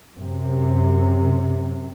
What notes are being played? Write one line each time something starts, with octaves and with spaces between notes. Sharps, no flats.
F#2 C3